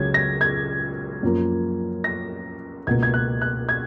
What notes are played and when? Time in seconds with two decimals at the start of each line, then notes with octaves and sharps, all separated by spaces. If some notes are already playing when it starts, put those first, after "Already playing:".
Already playing: C#2 C#3 F#3 G#6
0.14 A#6
0.41 G#6
1.23 F#2 F3 A#3
2.04 A#6
2.87 C#2 B2 A#3 G#6
3.03 G#6
3.14 F#6
3.42 F#6
3.69 G#6